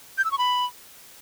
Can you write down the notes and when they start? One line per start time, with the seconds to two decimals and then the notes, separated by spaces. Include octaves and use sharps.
0.18 G6
0.25 E6
0.31 C#6
0.38 B5